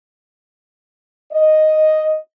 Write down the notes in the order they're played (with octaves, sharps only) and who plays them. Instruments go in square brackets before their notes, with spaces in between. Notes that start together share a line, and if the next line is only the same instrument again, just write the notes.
[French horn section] D#5